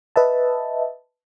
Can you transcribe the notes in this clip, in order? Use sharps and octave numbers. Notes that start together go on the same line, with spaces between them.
B4 D#5 E5 A5